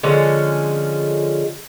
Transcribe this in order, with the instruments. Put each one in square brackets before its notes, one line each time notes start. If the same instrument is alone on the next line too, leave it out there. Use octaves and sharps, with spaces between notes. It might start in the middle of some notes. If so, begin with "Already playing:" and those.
[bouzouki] D3 F3 G#3 C#4